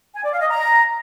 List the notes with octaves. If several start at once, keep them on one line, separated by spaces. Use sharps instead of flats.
G#5
D5
F5
D#5
A#5